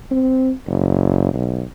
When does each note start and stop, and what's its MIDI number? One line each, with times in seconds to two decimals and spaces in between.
0.11 0.51 60
0.67 1.28 30
1.33 1.62 35